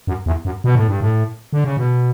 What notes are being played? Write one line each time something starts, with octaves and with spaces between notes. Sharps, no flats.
F#2
E2
F#2
B2
A2
G2
A2
D3
C#3
B2